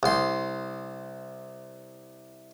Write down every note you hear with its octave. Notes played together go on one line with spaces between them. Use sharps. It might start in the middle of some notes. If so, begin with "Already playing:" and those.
C2 C6